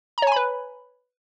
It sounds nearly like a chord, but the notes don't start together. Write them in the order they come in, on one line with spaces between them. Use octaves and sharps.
A#5 C#5 G#5 B5 B4